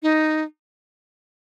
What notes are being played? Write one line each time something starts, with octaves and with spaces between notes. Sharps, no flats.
D#4